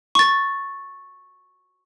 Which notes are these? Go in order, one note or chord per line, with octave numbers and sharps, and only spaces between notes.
C#6 A6